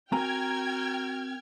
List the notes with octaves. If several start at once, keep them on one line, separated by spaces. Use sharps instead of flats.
C4 F#4 A#4 G5 G#5 A#5 F6 G#6